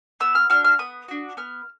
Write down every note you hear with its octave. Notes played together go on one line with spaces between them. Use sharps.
B3 E6
F6
D4 F#4 F6
F6
B3 D#6
D4 F#4
B3 F6